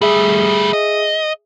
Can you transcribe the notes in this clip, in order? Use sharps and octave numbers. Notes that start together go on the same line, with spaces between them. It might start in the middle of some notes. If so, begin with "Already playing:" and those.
G3 A3 G#4 E5
D#5